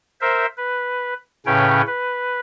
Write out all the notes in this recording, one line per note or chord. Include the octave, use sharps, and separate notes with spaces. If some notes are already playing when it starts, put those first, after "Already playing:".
A#4 C5 E5
B4
A2 C#3 C#4 B4 C#5 G5
B4